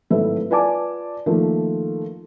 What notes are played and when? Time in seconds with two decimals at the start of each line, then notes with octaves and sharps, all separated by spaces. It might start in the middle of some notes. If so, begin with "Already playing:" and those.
0.10 G#1 A2 F#3 A4 B4 E5
0.50 F4 B4 D5 G#5 A5 D6
1.26 D#3 F3 A3 A#3